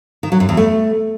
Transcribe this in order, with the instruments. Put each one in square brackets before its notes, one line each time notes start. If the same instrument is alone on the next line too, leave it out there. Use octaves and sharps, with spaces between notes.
[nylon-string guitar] D#3
F#3
F#2
E2
A3